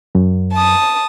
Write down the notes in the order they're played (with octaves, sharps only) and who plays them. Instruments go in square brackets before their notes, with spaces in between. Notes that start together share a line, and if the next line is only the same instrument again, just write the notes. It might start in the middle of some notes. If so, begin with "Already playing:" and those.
[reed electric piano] F#2
[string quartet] A5 D#6